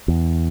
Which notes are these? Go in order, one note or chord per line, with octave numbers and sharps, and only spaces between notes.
E2